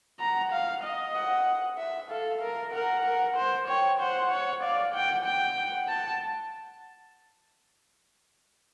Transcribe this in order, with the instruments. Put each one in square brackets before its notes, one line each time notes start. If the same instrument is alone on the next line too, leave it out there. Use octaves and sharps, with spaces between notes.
[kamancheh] F#5 [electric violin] A#5
[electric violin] F5
D#5
[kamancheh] F#5
E5
[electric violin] A4 [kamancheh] F5
[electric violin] A#4
[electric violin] A#4 [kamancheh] F#5
[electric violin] A#4
C5
[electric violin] C#5 [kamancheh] G5
[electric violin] C5 [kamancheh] F#5
[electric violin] C#5
[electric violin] D5 [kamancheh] F5
[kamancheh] F#5 [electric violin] G5
[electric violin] G5
[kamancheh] F#5
[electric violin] A5